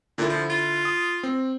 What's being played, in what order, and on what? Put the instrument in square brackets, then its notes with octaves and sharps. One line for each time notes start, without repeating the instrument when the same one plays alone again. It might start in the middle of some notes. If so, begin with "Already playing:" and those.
[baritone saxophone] A#2 [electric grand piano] D3 E4
[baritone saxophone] F3
F4
[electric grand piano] D#6
C4